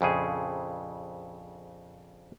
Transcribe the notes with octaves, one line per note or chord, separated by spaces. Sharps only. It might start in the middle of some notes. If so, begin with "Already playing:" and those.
A#1 F2 C#3 G#4